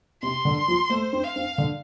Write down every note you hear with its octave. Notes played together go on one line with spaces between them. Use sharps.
C3 C6
D3
F3
A3 C5
C4
F5
C4
D3